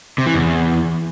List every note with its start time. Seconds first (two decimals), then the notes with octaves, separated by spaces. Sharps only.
0.18 C3
0.26 E3
0.34 E2